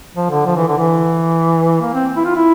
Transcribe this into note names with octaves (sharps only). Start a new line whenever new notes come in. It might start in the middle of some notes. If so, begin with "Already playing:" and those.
F3
D3
F3
E3
D3
E3
A#3
C4
E4
F4
E4